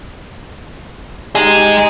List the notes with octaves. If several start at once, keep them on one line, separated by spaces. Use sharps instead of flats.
G#3 D#4 G4 G#4